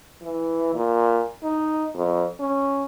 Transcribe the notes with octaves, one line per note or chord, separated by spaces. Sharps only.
E3
A#2
D#4
F2
C#4